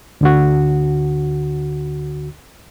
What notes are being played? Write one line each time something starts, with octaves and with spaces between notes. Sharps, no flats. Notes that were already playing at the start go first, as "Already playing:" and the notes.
D2 D3 F#4